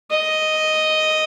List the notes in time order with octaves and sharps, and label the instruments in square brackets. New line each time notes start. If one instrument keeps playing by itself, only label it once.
[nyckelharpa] D#5